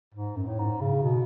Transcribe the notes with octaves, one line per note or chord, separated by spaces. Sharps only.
G#2
F#2
A2
G#2
C#3
B2